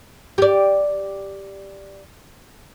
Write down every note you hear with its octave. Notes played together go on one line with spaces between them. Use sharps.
G4 D5